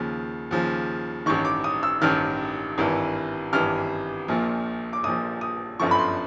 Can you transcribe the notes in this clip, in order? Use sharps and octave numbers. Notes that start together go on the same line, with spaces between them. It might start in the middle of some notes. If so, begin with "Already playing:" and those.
Already playing: D#2 C#3 F3
D#2 C#3 F3
A1 G2 D#3 C#6
D6
D#6
E6
A1 G2 D#3 F6
G#1 G2 E3
G#1 G2 E3 F6
A#1 A#2 F3
D6
A#1 A#2 F3 D#6
D#6
G1 F#2 D3 F3 C#6
B5
C6